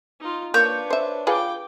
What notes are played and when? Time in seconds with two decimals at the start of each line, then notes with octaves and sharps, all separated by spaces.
0.20 D#4 F4
0.54 A#3 D4 B4 C#5 G6
0.90 C5 E5
1.27 F4 G#4 B4 G5 D6